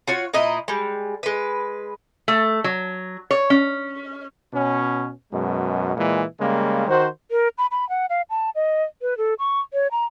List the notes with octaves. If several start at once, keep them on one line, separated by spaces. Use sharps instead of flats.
F4 F#4 C#5
A#2 E4 D#5 A#5
G3 G#3
G#3 B4
A3
F#3
C#5
C#4
B2 C#4
F#2 B2 G#3
A#2 E3 G#3
C#3 G3 G#3 A#3
D#3 F#4 C5
A#4
B5
B5
F#5
F5
A5
D#5
B4
A4
C#6
C#5
A#5